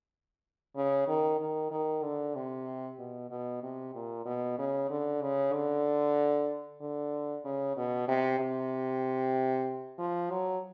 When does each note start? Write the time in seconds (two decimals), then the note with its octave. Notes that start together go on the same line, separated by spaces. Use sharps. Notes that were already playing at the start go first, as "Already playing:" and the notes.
0.76 C#3
1.08 D#3
1.40 D#3
1.71 D#3
2.03 D3
2.35 C3
2.99 B2
3.30 B2
3.63 C3
3.95 A#2
4.25 B2
4.58 C#3
4.90 D3
5.22 C#3
5.53 D3
6.81 D3
7.45 C#3
7.77 B2
8.08 C3
8.40 C3
9.99 F3
10.30 F#3